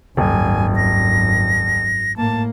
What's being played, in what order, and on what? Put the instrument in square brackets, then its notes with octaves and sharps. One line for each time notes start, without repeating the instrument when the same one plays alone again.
[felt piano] D#1 [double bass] G#1 F#2 [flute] G#5
[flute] A#6
[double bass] A2 A#3 [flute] A5